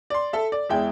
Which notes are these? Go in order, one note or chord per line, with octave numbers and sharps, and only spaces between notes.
D5 C6
A4 E5
D5
E2 G#3 E4 G5